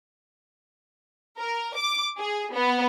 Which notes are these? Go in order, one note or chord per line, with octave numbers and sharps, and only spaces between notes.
A#4
D6
G#4
B3